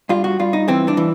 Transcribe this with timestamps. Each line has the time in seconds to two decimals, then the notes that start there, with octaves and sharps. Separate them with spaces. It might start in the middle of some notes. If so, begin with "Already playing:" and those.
0.09 G2 F4
0.24 F#4
0.39 G2 F4
0.53 D#4
0.68 E3 C4
0.88 D4
0.97 E3